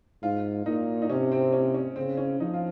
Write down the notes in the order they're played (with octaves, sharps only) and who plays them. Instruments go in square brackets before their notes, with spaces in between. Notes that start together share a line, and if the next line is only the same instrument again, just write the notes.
[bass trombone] G#2 [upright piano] F4
[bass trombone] A#2 [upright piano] D#4
[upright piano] D#4
[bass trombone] C3 [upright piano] C#4
[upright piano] C4
C#4
C#4
[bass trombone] C#3 [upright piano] C4
[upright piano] C#4
[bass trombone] F3 [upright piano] D#4
[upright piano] F4